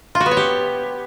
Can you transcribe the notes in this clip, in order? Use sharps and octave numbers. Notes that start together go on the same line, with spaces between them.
F4
F#4
B3
C#5
G4